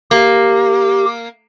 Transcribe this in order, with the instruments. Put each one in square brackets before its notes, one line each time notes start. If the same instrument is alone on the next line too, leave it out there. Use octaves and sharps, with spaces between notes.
[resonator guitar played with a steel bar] A#3 [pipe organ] G4